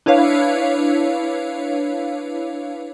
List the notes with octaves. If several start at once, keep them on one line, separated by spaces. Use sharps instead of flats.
D4 E4 B4 C#5 F5